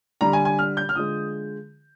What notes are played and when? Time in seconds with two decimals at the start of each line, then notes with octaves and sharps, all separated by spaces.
0.21 D3 G3 A#5
0.33 G#5
0.45 G#5
0.59 F6
0.77 G6
0.89 F6
0.95 D3 F3 G#3 D#6